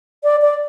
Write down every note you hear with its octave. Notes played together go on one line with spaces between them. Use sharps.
D5
D5